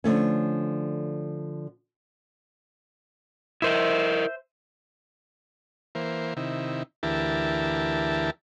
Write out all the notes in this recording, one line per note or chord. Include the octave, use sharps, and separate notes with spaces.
D3 F3 A3 C#4
E4 A#4 C5 D#5 E5
E3 A#3 C5
C3 D#3 E4
D2 E3 E4 G4 A#4 A5